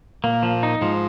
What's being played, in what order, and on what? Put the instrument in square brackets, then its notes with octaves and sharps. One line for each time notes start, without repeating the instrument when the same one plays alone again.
[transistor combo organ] A#2 [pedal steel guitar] A#3
[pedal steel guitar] F3
D#4
[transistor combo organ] G#2 [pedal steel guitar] F3